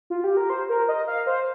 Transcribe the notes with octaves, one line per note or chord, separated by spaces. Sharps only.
F4
G4
A#4
C5
A#4
D#5
F5
C5